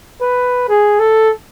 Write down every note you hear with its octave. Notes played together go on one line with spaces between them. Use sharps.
B4
G#4
A4